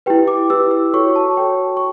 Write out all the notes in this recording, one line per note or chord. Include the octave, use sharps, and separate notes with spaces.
E4 G4 B4 G5
D6
E4 G4 B4 E6
E6
F#4 A4 C#5 C#6
A5
F#4 A4 C#5 G5
C#6